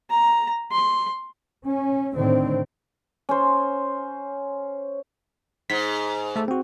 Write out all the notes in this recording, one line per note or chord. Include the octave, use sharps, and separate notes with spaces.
A#5
C6
C#4
A2 D3 D#3 C4
C#4 C5
G#2 B6
A3 A4
C4 F#4